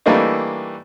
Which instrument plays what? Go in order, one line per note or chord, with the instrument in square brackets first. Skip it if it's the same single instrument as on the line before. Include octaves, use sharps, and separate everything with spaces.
[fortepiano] E3 G3 A3 A#3 D4 D#4